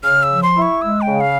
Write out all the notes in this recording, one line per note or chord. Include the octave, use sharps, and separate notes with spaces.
C#3 F6
E6
F3
C6
E4
C#6
G#3 E6
G5
C#3
F5